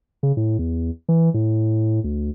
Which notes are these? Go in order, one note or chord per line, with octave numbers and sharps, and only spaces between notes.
C#3
A2
E2
E3
A2
D2